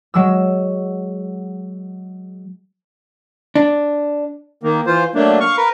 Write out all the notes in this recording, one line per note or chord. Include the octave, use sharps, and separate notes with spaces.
F#3 G#3 E6
D4
D#3 A#3
E3 F4 C5
F#3 A3 A#3 D4
F5 C#6
A#4 B4